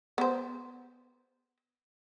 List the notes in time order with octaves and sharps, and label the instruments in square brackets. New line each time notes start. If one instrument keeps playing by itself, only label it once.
[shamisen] B3 C5